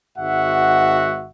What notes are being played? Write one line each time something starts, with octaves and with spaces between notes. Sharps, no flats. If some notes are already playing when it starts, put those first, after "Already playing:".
G#1 G#2 F#4 E5 F#5